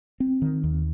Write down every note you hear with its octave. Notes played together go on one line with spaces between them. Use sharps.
C4
D#3
D#2